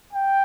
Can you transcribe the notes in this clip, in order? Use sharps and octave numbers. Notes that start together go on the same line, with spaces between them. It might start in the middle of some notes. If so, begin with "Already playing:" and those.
G5